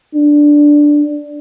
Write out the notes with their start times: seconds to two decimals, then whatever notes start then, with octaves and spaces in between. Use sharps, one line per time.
0.15 D4